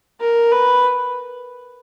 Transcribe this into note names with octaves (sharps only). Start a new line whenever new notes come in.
A#4
B4